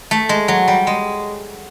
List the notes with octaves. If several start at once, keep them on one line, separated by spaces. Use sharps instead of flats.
A3
G#3
F#3
G3
G#3